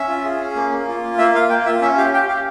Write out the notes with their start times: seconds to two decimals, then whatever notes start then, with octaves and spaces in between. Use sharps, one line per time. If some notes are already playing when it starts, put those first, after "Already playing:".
Already playing: C#4 E5
0.08 F4
0.24 G#4
0.41 C#4
0.56 A#3
0.72 A#3
0.88 F4
1.03 A#3
1.18 A#3 E5
1.34 F4 F5
1.50 A#3 G5
1.65 F4 E5
1.81 C#4 E5
1.97 G4 F5
2.13 G4 G5
2.28 G4 F5